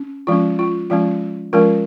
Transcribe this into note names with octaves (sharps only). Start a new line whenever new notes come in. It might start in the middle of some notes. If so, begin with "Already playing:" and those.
Already playing: C#4
F3 G#3 C#4 F4
F4
F3 G#3 C#4 F4
F3 G#3 C#4 F4 A#4